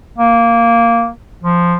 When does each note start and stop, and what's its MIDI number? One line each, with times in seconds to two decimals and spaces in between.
0.18 1.08 58
1.43 1.77 53